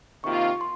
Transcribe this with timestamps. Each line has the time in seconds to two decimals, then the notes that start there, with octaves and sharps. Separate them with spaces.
0.24 C3 D#3 A#3 F4 C#6
0.61 C6